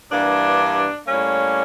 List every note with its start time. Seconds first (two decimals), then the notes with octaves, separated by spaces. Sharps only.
0.11 G2 E3 G3 A#3 D4
1.07 A2 G3 A#3 C#4